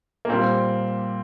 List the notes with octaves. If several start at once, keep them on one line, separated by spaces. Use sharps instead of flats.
A#3
A#2 G3 C4